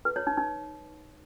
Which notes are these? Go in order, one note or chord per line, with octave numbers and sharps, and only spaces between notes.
B4
C#5
D#4
D#4